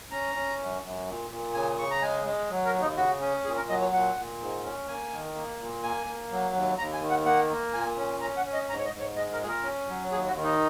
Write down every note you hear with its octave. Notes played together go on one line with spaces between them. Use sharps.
C#4 A#5
C#4
F#2
F#2
A#2
A#2
C#3 G#5
C#3 C#6
A#5
G#3 G#5
G#3
F#3
A#4
D#2
D#4
C#3 F#4
C#4
A#2 G#4
A#4
F#3 D#5
C#5
A#2 F#5
A#2
G#2
C#4
A#3 G#5
D#3
A#3
A#2
A#3 G#5
A#3
F#3
D#2
D#2 A#5
G#5
D#3
F#5
A#3 F#5
A#3
A#2 G#5
C#4
C#4 A#5
F#5
C#4
D#5
G#2 A#5
C#5
D#5
G#2
C#5
G#3 D#5
A#4
A#2 G#4
A#4
C#4
F#3
D#2 G#4
F#4
D#3
D#4